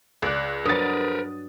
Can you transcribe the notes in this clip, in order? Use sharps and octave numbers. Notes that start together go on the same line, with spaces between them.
C#2 D5 F#6
G2 F#3 A#4 B4 D#6 A6